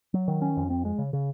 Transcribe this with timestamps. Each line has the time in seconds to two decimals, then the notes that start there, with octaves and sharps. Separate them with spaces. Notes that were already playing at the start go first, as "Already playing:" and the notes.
0.14 F#3
0.28 D#3
0.42 C#4
0.57 F2
0.70 C4
0.85 G#3
0.98 C#3
1.13 C#3